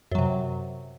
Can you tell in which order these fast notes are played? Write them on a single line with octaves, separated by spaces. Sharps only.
F#2 F#3 C3